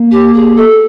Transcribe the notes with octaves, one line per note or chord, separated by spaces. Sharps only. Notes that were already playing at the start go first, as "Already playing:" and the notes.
Already playing: A#3
G4
G#4
A4